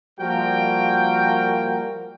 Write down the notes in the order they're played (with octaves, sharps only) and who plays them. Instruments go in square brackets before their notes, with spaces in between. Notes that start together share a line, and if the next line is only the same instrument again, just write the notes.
[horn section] F3 G3 A#3 F#4 A#4 G5